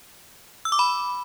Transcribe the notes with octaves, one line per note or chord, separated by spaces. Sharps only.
E6
D6
B5